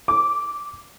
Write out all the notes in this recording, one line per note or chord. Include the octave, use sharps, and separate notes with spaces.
D6